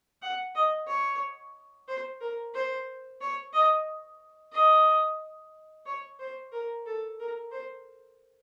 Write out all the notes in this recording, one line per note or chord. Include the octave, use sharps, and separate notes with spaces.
F#5
D#5
C#5
C5
A#4
C5
C#5
D#5
D#5
C#5
C5
A#4
A4
A#4
C5